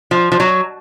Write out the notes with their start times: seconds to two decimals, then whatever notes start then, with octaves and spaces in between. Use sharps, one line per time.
0.11 F3
0.32 F3
0.40 F#3